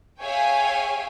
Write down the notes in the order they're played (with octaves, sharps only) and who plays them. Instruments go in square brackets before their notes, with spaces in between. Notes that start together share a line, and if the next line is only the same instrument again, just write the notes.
[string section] G#4 C#5 E5 F5 G5 G#5